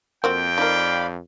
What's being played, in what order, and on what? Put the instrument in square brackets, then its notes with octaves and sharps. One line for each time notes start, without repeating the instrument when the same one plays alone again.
[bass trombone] F2 [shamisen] A#3 C4 F#4 [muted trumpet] G5
[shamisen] D#4 A#4 [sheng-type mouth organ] D5 F5 B5